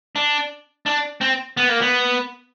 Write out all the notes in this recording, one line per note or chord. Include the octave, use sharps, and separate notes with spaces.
D4
D4
C4
B3
A#3
B3